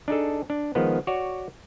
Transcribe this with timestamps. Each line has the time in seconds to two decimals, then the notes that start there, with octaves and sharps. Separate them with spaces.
0.08 D4 D#4 G#4 A4
0.50 D4
0.75 D#3 F3 G#3 B3
1.07 F#4 C#5 D5